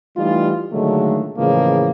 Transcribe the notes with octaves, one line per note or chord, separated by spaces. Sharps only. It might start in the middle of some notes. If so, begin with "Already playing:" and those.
E3 G3 A3 D#4 F4
A#2 D3 D#3 F#3 G#3 A3
A2 C#3 E3 F3 G#3 A#3